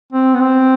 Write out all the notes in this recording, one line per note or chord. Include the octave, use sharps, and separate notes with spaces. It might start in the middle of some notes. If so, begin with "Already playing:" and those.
C4
B3
C4